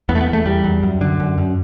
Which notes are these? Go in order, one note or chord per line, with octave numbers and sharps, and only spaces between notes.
E2 B3
A3
B3
E2
A3
E2 G3
E2
F#2
D3
F#2
F#2